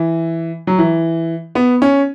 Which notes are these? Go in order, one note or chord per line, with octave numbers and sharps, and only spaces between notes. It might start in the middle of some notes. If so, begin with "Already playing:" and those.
Already playing: E3
F#3
E3
B3
C#4